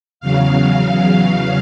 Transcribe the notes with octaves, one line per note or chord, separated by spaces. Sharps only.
E2 C#3 F#3 F5
E2 C#3 F#3